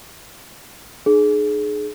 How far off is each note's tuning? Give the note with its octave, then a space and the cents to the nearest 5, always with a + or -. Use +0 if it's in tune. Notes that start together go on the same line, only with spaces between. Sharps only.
D#4 -45 G#4 +25